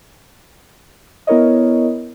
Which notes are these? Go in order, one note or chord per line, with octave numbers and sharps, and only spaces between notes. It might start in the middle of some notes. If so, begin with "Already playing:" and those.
B3 E4 A#4 C#5 D#5